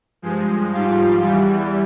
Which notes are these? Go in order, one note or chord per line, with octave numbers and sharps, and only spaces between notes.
G2 F3 G#3
G#2 F3 G3 F4
E2 E3 G3